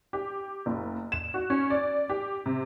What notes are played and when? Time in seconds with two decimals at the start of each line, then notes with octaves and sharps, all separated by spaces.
0.13 G4
0.66 F#1
1.12 E7
1.34 F#4
1.50 C#4
1.70 D5
2.10 G4
2.46 C3